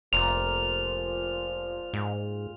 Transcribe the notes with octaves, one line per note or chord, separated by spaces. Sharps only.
F1 A#2 F3 A#3 F4 F7
G#2